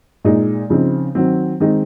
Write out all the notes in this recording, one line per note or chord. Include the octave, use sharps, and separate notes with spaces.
A#2 G#3 D#4
C#3 F3 C4 D#4
D#3 F#3 C4
D#3 G#3 C4 D#4